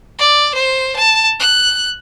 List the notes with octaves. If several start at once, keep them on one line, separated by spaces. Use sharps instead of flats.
D5
C5
A5
F#6